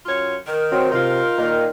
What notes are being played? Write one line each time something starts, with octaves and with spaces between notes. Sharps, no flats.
F#2 F4 C#5
D#3 A#4
F#3 C4
C3 D#4 F4
A#2 D#3